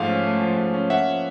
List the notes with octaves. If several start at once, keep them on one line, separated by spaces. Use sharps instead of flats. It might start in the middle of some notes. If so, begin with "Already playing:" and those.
Already playing: G#2 F3 A3 F5
C#4
A3
F3
G#2
C#4
A#3 E5 F#5
F3